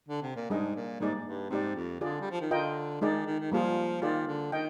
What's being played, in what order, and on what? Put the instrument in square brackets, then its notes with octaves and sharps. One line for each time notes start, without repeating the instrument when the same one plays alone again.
[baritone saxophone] D3
C3
A#2
[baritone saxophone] G#2 [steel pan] G3 D4 G#4 D#5
[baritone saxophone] A#2
[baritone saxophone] G#2 [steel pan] G3 A#3 D#4 G#4 D5
[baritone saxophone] G#2
G2
[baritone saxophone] G#2 [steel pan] C4 G4 D5
[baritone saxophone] F2
[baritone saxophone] D3 [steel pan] F4 G#4 D5
[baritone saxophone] G3
F3
D#3
[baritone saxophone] D3 [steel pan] F4 A#4 D#5 G5
[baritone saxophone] D#3 [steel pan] G#3 D#4 G#4 D5
[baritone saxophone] D#3
D#3
[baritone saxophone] F3 [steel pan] G3 A#3 F4 G#4
[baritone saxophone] D#3 [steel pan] F4 G#4 D5
[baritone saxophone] D3
[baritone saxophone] D#3 [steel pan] D#5 G5